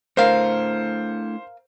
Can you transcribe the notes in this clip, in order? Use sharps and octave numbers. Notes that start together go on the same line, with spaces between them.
A3 D4 E4 A#4 C5 F5